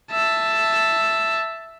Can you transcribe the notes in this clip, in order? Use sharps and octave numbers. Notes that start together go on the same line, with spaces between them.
E5 A5